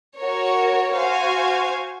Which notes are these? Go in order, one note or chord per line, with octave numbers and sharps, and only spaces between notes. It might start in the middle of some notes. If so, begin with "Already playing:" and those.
F#4 A#4 C#5
F#4 C5 F5 G#5